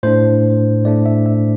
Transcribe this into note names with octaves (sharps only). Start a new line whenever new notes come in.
A2 A3 D4 C5
A2 A3 D4 D5
E5
E5